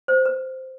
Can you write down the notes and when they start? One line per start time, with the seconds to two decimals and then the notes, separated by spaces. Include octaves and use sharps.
0.08 C5
0.25 B4